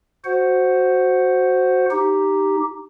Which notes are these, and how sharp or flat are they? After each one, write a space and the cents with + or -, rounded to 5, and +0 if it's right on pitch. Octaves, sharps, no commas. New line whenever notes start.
F#4 +0 C5 +0 F#5 +0
D#4 +0 G4 +0